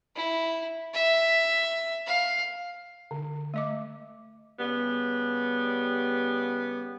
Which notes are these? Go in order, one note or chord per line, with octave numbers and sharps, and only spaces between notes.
E4
E5
F5
D3
A3 D#5 D6
C#3 G3 B3